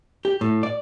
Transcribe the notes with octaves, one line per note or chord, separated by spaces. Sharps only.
G4
A2
D5